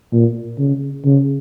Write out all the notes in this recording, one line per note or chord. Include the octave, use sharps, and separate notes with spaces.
A#2
C#3
C#3